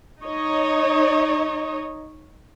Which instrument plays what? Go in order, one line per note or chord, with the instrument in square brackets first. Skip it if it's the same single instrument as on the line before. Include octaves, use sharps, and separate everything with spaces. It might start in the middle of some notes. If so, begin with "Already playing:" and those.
[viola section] D#4 C#5 D#5